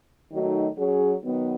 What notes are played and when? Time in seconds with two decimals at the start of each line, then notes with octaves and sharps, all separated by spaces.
0.31 D#3 F#3 A3 D#4 F#4
0.78 F#3 C#4 G#4
1.24 D#3 F#3 B3